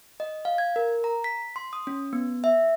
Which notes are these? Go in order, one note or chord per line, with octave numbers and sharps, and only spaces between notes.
D#5
F5
G#6
A#4
A#5
B6
C6
D#6
C#4
B3
E5